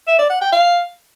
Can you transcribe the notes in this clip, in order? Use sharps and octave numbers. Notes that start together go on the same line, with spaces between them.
E5
D5
F#5
G5
F5